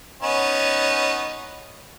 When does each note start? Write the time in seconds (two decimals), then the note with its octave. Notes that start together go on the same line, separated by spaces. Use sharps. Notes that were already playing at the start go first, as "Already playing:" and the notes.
0.23 B3 C#4 D#4